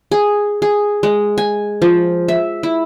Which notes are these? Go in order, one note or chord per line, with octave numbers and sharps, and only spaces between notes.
G#4
G#4
G#3
G#5
F3
E5
E4